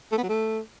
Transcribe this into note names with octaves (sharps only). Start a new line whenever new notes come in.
A3
B3
F#3
A3